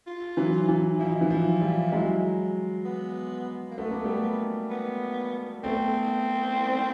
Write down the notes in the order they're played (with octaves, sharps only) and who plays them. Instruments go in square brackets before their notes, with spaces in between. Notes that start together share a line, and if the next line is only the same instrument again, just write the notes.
[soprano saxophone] F4
[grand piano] E3 F#3
E3
[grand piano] F3 [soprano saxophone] E4
[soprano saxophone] D#4
E4
[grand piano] E3
F3
F3 G3
F#3 G#3
[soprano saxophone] B3
A#3
[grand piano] A3 [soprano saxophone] B3
[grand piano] A#3
G3 A3
[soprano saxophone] B3
[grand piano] A3 B3 [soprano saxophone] C4